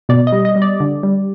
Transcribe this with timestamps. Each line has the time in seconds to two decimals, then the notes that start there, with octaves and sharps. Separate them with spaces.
0.09 B2 D5
0.27 D#5
0.32 G3
0.45 D#5
0.56 G3
0.62 D5
0.80 D3
1.03 G3